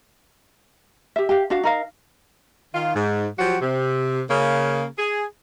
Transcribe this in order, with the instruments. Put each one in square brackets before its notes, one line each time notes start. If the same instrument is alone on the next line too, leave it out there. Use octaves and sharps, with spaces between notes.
[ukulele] G4 E5
G4 F5
D4 F#4 F5
D#4 A#4 F5
[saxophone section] D#3 F4
G#2
F3 F#3 F#4 G4
C3
C#3 A#3
G#4